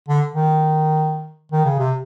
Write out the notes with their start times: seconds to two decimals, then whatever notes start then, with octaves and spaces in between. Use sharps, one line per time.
0.09 D3
0.34 D#3
1.52 D#3
1.65 C#3
1.79 C3